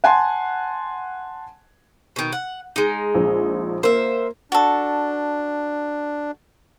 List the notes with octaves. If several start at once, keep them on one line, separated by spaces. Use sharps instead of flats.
F#5 G#5 A5 C6
B2 D#3
F#5
G#3 D#4
A#1
A#3 C5 E5
D4 F#4 A4